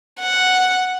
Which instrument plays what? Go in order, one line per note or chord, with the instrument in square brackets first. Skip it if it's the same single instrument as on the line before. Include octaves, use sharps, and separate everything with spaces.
[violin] F#5